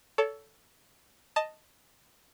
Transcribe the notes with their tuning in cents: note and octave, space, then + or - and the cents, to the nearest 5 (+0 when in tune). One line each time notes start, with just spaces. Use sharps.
A4 +0 C#5 +35
D#5 +0 A5 +10